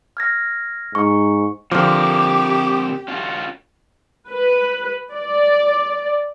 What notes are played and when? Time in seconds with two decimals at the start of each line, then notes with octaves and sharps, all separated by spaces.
0.17 F6 G#6 A#6
0.95 G#2 C#6
1.72 D3 F3 C4 G4 A#4 C5 D6
3.08 C#4 F4 F#4
4.30 B4
5.12 D5